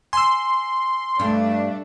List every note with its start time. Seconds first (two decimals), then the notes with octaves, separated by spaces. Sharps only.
0.13 G#5 C6 E6
1.20 G2 A3 D4